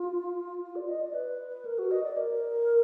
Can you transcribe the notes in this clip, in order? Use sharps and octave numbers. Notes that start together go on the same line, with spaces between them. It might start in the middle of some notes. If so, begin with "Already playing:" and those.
Already playing: F4
F4
D5
D#5
D5
B4
A#4
F#4
D#5
D5
A#4